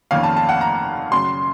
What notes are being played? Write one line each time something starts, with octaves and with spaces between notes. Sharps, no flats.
F1 F2 D#3 A#3 C#4 F5
A5
A5
F#5
A#5
F#2 C#3 F#3 C6